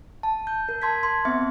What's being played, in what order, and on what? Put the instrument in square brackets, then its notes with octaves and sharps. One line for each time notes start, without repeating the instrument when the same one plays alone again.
[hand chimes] A5
G6
A#4
A5 C6 G#6 B6
C6
B3 C4 E5